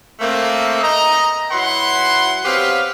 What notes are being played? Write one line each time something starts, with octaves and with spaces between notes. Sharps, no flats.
A3 A#3 C4
D#5 A#5
F#3 E4 B4 F#5 C6
B3 C4 G4 B4 C#5 F5